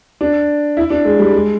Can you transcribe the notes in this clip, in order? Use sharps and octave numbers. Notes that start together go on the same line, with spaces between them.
D4
E4
D4
G#3
G3
G#3